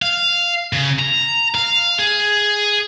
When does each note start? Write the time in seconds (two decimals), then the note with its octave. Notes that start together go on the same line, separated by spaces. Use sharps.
0.02 F5
0.73 C#3
0.99 A#5
1.55 F5
1.99 G#4